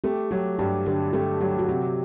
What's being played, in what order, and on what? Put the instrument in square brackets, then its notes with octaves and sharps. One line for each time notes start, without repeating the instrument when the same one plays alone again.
[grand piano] A3 [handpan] G4
[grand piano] F#3 [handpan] G4
[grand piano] G2 [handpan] G4
[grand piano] D3 [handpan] G4
[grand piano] A3 [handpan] G4
[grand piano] F#3 [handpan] G4
[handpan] F#4
[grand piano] C3 [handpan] G4